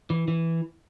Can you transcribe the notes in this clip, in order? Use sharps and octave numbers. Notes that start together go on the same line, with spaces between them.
E3
E3